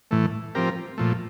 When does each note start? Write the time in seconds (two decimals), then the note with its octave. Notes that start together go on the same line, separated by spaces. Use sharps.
0.11 A2 E3 A3
0.55 F3 C4 G4 A#4
0.98 A#2 F3 A3